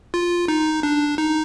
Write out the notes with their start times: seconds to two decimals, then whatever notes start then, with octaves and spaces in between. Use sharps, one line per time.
0.14 F4
0.48 D#4
0.83 D4
1.18 D#4